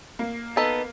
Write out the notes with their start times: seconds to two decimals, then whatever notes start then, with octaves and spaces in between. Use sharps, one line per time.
0.19 A#3
0.57 B3 D#4 A4